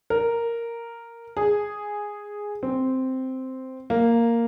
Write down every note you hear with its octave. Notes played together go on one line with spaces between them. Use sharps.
A#4
G#4
C4
A#3